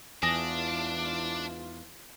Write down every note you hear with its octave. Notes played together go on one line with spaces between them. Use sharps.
E2 G#2 E3 D4 F4 G#5 D#6 A#6